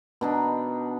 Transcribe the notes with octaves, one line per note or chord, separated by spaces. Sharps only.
B2 D4 D#4